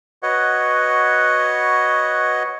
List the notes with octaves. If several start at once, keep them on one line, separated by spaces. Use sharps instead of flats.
F#4 B4 C#5 D#5 F#5